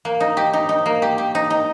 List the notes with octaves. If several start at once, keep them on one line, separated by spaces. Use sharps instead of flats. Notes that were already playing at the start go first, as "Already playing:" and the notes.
A#3
D#4
G4
D#4
D#4
A#3
G4
G4
D#4
D#4